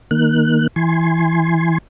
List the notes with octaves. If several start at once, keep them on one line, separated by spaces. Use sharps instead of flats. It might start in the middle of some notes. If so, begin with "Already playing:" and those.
D#3 A#3 F#6
E3 G#5 C6